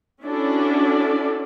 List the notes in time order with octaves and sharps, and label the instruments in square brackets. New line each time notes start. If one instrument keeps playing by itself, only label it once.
[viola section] C#4 D4 E4 F#4 A4 D5